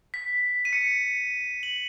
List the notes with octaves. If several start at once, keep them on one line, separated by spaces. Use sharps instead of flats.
B6
D#7
C#7
F#7